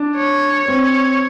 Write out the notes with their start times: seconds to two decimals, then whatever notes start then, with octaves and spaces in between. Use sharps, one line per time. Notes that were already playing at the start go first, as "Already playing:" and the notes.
Already playing: D4
0.17 C#5
0.68 C4 C#5